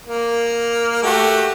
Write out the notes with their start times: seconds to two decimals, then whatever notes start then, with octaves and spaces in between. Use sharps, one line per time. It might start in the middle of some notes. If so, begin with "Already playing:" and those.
0.06 A#3
1.03 A3 F#4 G4